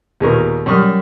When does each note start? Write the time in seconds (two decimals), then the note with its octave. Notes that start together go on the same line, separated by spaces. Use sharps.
0.20 D#2 A#2 G#3 B3 A#4 C#6
0.66 F#2 G3 F#5 C#6 D#6 F6